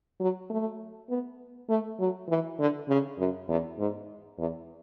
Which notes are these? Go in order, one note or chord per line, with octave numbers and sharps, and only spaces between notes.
F#3
A3
B3
A3
F#3
E3
D3
C#3
F#2
E2
G#2
E2